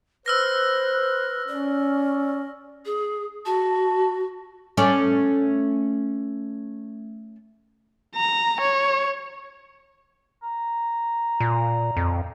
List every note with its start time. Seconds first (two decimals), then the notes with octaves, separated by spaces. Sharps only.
0.26 B4 C5 E6 F6 A#6
1.48 C#4 D5
2.86 G#4
3.46 F#4 A5
4.77 A3 C#4 D5
8.15 A#5
8.60 C#5
10.43 A#5
11.40 A#2
11.97 F2